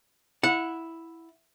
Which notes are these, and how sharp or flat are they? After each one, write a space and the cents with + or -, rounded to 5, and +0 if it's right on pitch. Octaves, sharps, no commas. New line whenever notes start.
E4 +0 F#5 -20